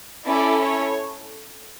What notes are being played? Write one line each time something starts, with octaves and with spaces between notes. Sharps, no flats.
C#4 E4 A4 D5
C#5